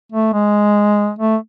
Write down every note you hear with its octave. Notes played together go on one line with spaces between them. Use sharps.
A3
G#3
A3